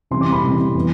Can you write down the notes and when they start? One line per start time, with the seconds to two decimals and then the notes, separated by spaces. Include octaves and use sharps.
0.11 C3 E3 G3 C4 C6
0.21 D6
0.32 B5
0.43 C3 E3 G3 C4
0.75 E3 B3